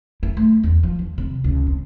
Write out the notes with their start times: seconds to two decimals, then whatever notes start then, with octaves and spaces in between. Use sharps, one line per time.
0.23 E4
0.37 A3
0.63 E2
0.83 F3
0.99 E2
1.18 C3
1.44 C#2
1.67 C3